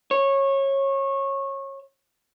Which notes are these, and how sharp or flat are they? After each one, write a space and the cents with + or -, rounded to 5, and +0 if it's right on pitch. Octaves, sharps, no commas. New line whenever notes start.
C#5 -20